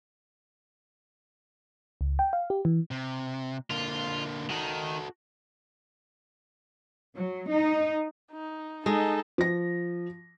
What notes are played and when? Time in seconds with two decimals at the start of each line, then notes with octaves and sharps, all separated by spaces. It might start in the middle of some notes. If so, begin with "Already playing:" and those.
2.01 C#2
2.19 G5
2.33 F5
2.50 G4
2.65 E3
2.91 C3
3.71 D3 A#3 F4
4.50 D#3 F#4 A4
7.16 F#3
7.50 D#4
8.32 D#4
8.86 G#3 D#4 A4
9.38 F3 A#6